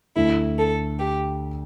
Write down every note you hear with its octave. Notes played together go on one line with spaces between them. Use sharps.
D2 D3 A3 E4
A4
G4